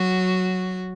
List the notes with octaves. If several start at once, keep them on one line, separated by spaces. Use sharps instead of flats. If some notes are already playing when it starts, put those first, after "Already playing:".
Already playing: F#3 F#4